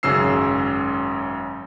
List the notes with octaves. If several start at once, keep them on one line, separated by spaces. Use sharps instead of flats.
G#1 F#2 C#3 C#4 E6 C7